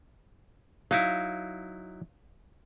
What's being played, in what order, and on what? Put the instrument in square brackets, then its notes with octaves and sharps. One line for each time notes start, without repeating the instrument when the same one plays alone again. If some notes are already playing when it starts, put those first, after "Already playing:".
[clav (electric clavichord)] F#3 D#4 E4 [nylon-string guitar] F5